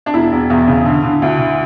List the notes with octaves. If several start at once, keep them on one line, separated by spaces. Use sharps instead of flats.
D4
E1 E4
E1
E2
C#3
D3
D3
D2
D3